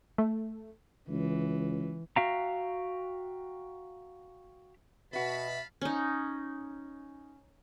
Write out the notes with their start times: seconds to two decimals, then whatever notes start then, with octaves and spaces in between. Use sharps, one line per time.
0.18 A3
1.09 C#2 E3
2.16 F#4 E5 F5 G5 A#5
5.13 B2 F#4 B4 E5 F5 A5 B5
5.81 C#4 D#4